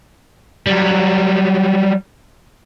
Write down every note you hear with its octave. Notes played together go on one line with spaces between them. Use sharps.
F#3 G3